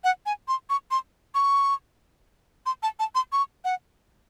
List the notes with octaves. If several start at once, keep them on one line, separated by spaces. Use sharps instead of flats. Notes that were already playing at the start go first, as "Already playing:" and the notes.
F#5
G#5
C6
C#6
C6
C#6
C6
A5
A5
C6
C#6
F#5